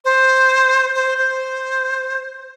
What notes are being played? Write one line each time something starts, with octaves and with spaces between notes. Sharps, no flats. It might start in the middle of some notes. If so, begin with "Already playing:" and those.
C5
C5
C5